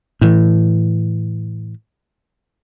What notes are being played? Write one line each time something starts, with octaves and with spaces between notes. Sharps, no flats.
A2 E3